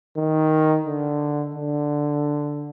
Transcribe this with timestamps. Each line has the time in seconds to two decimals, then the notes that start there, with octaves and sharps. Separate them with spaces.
0.17 D#3
0.86 D3
1.55 D3